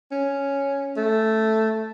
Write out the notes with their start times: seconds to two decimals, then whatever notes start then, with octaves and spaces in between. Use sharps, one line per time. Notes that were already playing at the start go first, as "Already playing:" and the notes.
0.11 C#4
0.97 A3